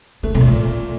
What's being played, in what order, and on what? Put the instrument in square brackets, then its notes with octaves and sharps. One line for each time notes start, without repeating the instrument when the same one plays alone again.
[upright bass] D3 [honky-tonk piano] A3
[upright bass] C3
[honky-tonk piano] A#2
[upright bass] A2